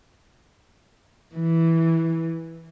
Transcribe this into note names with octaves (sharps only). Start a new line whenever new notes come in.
E3